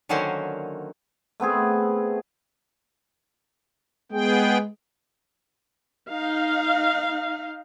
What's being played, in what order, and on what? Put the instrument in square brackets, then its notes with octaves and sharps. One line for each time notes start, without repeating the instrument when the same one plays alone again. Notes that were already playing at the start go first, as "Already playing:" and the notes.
[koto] D3 D#3 F#3 A#3 C#4 C5
[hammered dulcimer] A3 B3 C4 G#4
[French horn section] G#3 [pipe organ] B3 G#4 G5
[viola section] D#4 F5